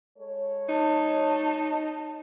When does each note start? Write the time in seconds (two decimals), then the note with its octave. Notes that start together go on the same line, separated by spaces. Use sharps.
0.19 G#3 A4 C#5
0.69 D#4 A5